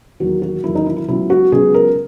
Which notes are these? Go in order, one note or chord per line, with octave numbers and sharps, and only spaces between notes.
E2 D#3 F#3 A#3 F#4
F#4
E2 D#3 F#3 A#3 E4
D#4
E4
E4
C#2 C#3 F#3 B3 E4
F#4
C#2 C#3 F#3 B3 G#4
A#4